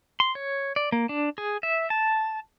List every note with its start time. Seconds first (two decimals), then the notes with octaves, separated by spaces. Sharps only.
0.20 C6
0.35 C#5
0.76 D5
0.92 A#3
1.09 D4
1.38 G#4
1.63 E5
1.90 A5